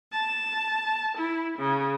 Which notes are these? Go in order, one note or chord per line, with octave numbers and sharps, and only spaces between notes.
A5
E4
C#3